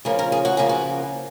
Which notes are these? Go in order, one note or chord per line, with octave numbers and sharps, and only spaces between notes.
C#3 F3 A#3 F4 A#4
A#4
G#4
F#4
C#3 F3 A#3 F4 G#4
F#4